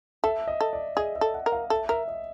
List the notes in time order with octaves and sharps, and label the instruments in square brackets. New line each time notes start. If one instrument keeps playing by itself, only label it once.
[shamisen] A4 [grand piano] E5
[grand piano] D#5
[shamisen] A4
[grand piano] D5
[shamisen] G#4 [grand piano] D#5
[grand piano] E5
[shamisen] A4
[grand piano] F#5
[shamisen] A#4
[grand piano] F5
[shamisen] A4 [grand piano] E5
[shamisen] A#4 [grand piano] E5
[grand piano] D#5